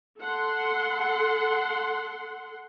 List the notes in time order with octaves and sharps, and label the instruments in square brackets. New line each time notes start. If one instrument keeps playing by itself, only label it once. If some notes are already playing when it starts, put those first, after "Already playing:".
[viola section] A4 F#5 C6